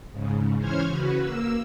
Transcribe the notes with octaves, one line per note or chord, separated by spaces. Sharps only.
G#2 C#3
E3 C#4 C5 C#5 F6 G#6
C#3 F#4 B4
A#3 E6